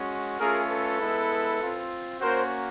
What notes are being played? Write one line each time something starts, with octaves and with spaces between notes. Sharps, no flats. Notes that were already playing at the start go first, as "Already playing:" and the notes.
Already playing: G#3 C#4 F#4
A3 C#4 F4 G#4 A#4
A4 B4
G#3 B3 E4
C4 F4
A#3 C#4 F#4 A#4 C5